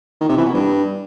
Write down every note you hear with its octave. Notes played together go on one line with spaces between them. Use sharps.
D#3
C3
E3
B2
G2